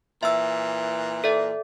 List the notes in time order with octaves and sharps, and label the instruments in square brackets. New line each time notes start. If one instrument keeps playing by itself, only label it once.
[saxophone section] A#2 E3 [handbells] E5 E6
[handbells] A4 D5 E5